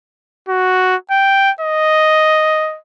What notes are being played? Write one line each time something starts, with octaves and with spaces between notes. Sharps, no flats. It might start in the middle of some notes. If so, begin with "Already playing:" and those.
F#4
G5
D#5